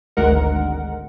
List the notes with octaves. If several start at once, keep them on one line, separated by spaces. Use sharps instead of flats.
G#1 D2 G#3 A#4 F#5